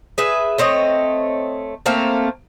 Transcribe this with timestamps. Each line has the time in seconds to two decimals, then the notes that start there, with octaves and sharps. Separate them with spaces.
0.18 G#4 B4 E5
0.58 A3 C4 C#5 D#5
1.86 A3 A#3 C4 F5